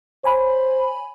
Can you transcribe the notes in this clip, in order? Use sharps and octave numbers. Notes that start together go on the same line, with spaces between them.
C5 C#5 G#5 B5